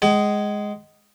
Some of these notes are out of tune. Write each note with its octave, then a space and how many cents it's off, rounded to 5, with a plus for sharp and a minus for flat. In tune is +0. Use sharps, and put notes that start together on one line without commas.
G#3 +0 G#4 +0 F#5 +45